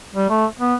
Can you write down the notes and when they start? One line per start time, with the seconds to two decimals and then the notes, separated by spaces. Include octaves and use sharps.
0.15 G3
0.30 A3
0.59 B3